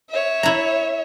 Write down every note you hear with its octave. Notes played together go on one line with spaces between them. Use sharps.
C#5 E5
E4 A#5